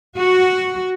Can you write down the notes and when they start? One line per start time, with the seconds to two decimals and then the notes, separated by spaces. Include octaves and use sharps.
0.17 F#4